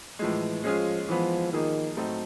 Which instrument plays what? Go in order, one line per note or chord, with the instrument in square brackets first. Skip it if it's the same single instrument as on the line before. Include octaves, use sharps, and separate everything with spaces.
[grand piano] A2 F3 G#3 [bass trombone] E3
[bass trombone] F3 [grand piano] G#3 C#4 F4 G#4
[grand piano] E3 G#3 B3 [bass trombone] F3
[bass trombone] D#3 [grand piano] F3 A#3 D#4 G#4
[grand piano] A2 F#3 A3 C4 D#4